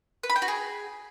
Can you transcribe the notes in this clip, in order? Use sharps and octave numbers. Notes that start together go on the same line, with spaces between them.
B4
B5
G5
F#4
G#4